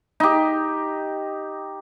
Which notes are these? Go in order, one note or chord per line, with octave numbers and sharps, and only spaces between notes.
D#4 G4